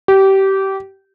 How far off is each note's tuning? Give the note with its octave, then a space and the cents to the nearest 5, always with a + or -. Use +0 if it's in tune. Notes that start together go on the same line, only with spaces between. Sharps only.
G4 -20